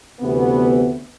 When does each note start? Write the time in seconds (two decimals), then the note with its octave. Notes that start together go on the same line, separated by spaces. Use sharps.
0.19 D2 C3 E3 B3